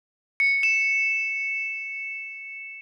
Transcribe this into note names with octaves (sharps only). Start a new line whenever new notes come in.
C#7
E7